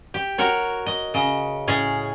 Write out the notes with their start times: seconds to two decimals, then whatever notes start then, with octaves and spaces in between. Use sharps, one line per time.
0.14 G4
0.38 F#4 A#4 C#5
0.86 D#5
1.14 C#3 D#5
1.68 A2 C#4 G#4